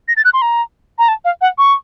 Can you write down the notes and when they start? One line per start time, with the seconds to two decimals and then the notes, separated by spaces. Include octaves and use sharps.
0.08 A#6
0.17 A6
0.25 F#6
0.33 C6
0.42 A#5
0.99 A#5
1.08 A5
1.25 F5
1.41 F#5
1.58 C#6